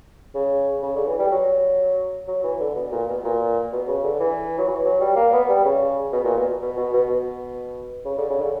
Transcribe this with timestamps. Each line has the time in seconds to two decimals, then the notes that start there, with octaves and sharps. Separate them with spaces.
0.35 C#3
0.83 C#3
0.96 D3
1.07 E3
1.19 G3
1.32 F#3
2.28 F#3
2.43 E3
2.60 D3
2.76 B2
2.92 A#2
3.08 B2
3.24 A#2
3.73 B2
3.88 C#3
4.04 D3
4.20 E3
4.58 F#3
4.68 E3
4.85 F#3
5.00 G3
5.16 A#3
5.33 B3
5.49 G3
5.64 C#3
6.12 B2
6.25 A#2
6.37 B2
6.62 B2
6.77 B2
6.93 B2
7.09 B2
8.05 C#3
8.18 D3
8.30 C#3
8.41 D3